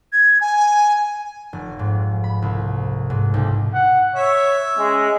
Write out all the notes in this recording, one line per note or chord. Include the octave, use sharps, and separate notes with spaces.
G#6
G#5
F1
G#2
B5
C2
G#2
B1
F#5
C#5 E5 E6
G#3 C#4